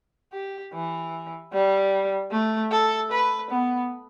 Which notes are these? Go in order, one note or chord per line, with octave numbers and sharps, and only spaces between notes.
G4
E3
G3
A3
A4
B4
B3